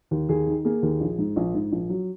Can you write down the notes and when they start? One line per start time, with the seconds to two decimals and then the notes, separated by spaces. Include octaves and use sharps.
0.11 D#2
0.29 D#2 G#4
0.47 D#3
0.65 A#3 G#4
0.83 D#2
1.00 A#1
1.19 G#2
1.36 A#1
1.54 G#2
1.72 A#1
1.90 F#3